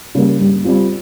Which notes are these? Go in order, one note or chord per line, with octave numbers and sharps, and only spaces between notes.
C#3 G3 A#3
G2
G3 C4 F4